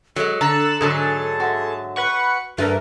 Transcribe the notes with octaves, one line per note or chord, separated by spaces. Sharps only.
F#3 G#3 A4
D3 A5 A#5 E6 F#6
G#2 D3 F#3 G#4 A5
F#4 C5 E5
B4 F#5 C#6
G2 A3 A#4 B4